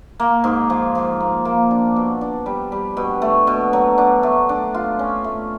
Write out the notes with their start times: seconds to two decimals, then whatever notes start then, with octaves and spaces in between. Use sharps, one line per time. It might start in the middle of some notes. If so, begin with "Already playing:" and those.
0.20 A#3
0.44 G#2
0.70 F3
0.95 F3
1.20 A#3
1.45 A#3
1.71 D4
1.96 B2
2.21 D4
2.46 G3
2.72 G3
2.97 B2
3.22 A3
3.47 B2
3.73 F#3
3.98 D4
4.23 A3
4.49 D4
4.74 F4
4.99 C#4
5.24 A3